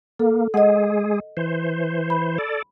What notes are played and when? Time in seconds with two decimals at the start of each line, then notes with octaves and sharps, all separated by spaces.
0.19 A#3 A4
0.54 G#3 G#4 D#5 F#5
1.37 E3 C5
2.10 B5
2.38 A4 D5